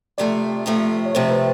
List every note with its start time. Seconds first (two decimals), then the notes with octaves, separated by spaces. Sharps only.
0.18 F2 C3 F3 A3 D5
0.66 F2 C3 F3 A3
1.06 C#5
1.15 F2 C3 F3 A3 C5
1.31 B4